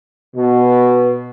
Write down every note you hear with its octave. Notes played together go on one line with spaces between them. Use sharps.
B2